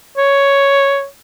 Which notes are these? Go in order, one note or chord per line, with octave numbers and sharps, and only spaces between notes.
C#5